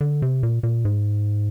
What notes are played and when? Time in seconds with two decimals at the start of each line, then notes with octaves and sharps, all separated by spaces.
0.01 D3
0.22 C3
0.43 A#2
0.63 A#2
0.85 G#2